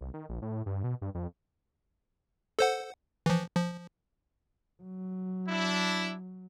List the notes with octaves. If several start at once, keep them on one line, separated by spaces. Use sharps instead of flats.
C2
D#3
A#1
A2
G2
B2
G2
F2
A4 C5 F#5
E3 F3
F3
F#3
D4 E4